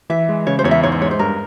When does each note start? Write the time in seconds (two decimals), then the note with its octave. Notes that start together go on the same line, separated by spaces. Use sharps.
0.10 E3 E5
0.29 G#3
0.47 C#3 C#5
0.59 C5
0.64 E2 C#5
0.71 E5
0.83 G#2 C#5
0.92 C5
1.01 G#3 C#5
1.11 C5
1.19 G2 A#4